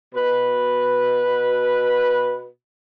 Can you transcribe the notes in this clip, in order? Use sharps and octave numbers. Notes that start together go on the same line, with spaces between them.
B2 B4